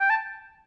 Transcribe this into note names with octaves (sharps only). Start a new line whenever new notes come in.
G5
A5